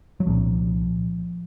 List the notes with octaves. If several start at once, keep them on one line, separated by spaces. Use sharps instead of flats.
F#3
C2 A#2 F3